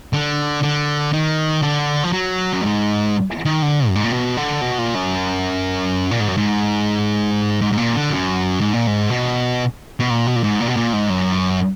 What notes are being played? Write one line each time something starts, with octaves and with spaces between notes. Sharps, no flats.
D3
D3
D#3
D3
F3
F#3
F#2
G#2
D#3
D3
F#2
G#2
A#2
B2
D3
B2
A#2
F#2
A#2
G#2
F#2
G#2
G#2
G#2
A#2
D3
F#2
G#2
A#2
G#2
B2
B2
A#2
B2
A#2
G#2
A#2
B2
A#2
G#2
F#2